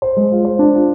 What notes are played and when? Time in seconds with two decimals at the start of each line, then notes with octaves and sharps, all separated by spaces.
0.02 C5
0.17 G#3
0.32 F4
0.45 C5
0.59 D4
0.74 F4